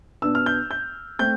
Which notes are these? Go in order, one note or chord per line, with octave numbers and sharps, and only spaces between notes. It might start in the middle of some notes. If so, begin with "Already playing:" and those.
B2 B3 D4 E6
F6
G6
G6
A3 C4 G6